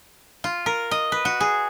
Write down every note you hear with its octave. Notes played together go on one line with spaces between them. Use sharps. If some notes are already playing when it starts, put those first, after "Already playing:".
F4
A#4
D#5
B4
F#4
G#4